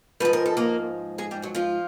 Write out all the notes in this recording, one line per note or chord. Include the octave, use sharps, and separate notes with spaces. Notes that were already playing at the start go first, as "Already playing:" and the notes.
G#2 F3 G#3 B4
A#4
A4
A#3 A#4
G#3 G#4
G3 G4
F#3 F#4
F3 F4